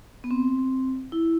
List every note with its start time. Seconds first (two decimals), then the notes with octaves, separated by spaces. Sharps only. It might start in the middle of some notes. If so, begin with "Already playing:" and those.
0.24 B3
0.31 C4
1.12 E4